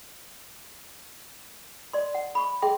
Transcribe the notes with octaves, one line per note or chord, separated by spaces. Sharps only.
D5 C6
F#5
B5 C#6
G#4 E5 G5 C6